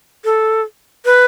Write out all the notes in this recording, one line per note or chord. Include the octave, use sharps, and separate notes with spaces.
A4
B4